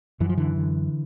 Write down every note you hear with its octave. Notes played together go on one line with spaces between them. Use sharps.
F#2 E3
F3
D3 E3
D3